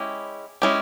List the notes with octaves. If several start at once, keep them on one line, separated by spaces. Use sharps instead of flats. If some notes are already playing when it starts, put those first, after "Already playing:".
Already playing: G#3 C#4 E4 G4
G#3 C#4 E4 G4